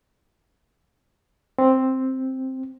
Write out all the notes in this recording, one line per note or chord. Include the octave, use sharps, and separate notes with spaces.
C4